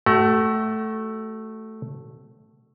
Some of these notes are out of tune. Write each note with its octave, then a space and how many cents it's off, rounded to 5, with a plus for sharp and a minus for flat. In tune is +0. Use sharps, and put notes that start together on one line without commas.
A3 +0 F#4 +35